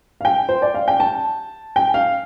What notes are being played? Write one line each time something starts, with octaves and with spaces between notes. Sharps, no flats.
F5
G5
C5
D5
F5
G5
A5
G5
F5